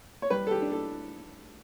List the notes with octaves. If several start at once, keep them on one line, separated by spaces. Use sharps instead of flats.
C#5
G3 B4
A4
G4
D4
A4